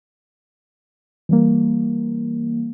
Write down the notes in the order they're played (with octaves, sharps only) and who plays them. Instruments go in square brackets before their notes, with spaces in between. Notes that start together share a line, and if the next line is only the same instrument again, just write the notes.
[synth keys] E3 G3 A#3